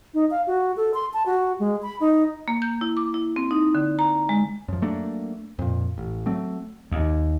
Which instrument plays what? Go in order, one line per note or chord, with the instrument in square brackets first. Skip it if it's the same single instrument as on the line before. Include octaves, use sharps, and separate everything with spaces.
[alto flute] D#4
F5
F#4
A4
C6
A5
F#4
G#3
B5
D#4
[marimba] A#3
G6
E4
D6
E4
C4
D#4
D3
A#5
G#3
[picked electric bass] F#2 F3
F#3 A3 A#3 D4
F2 A#2
A1
F#3 A3 C4
[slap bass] D#2